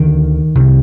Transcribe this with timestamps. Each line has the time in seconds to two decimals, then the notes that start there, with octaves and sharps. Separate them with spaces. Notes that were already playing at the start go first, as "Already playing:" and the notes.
Already playing: D2 D3 D#3
0.55 C2
0.60 C3